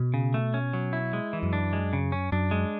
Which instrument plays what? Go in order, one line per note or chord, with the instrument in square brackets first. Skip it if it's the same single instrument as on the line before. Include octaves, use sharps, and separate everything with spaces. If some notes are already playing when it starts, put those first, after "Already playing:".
Already playing: [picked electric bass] B2
[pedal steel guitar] C#3
A3
C#4
F#3
E4
G#3
E3
[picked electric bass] F#2
[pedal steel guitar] D4
G#3
C#3
C#4
[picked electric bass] F#2 [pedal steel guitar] D4
[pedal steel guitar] G#3